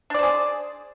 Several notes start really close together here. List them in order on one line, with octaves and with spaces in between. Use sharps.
D4 D5 C5 G#4